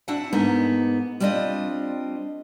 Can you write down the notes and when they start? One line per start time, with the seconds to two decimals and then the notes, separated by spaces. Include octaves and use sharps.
0.08 C4 D4 E4 F#4 F#5
0.33 G#2 A#3 B3 D#4
1.20 G3 C4 D4 F4 D#5